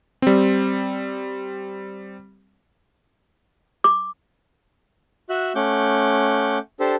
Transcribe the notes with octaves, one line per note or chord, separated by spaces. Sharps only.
G3 C4
D6
F#4 E5 F#6
A3 C#4 F#5 D6 G6
D4 G4 A4 C5